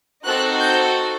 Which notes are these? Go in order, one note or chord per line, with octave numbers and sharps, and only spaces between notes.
C4 D#4 F#4 A4 F#6
G6